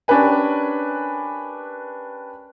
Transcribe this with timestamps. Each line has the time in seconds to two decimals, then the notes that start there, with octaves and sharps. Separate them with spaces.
0.08 C#4 D4 G4 A#4 B4 G#5